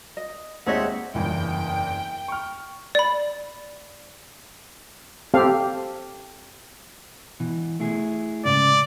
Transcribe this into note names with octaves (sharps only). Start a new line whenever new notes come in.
D#5
D#2 G#3 C4 D#4 C#5 D#5 E5 F#5
F#1 E2 G2 G5
C#6 F6
D5 B5
C4 G4 A4 F5
B2 E3
A3 E4 G#4
G#2 C#3 D5